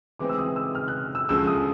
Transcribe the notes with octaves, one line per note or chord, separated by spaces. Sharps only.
E3 G#3 C4 D#4 D6
E6
D#6
E6
F6
F#6
E6
D2 C#3 F3 G#3 E6
D#6